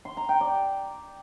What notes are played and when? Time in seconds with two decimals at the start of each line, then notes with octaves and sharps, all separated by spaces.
0.05 C6
0.17 A#5
0.29 G5
0.41 D5